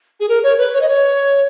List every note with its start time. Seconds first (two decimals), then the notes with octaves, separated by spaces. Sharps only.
0.20 G#4
0.29 A#4
0.43 C#5
0.58 B4
0.74 C#5
0.81 D#5
0.88 C#5